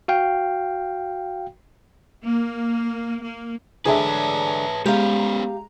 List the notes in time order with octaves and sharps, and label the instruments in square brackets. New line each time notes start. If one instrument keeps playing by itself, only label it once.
[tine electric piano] F#4 F5 G5
[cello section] A#3
A#3
[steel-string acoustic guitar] D3 G#3 D4 [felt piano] G#4 E5 [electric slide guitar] B4 C#5 A5
[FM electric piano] G#3 A#5 [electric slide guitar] B3 C#4 [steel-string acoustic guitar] G4 F5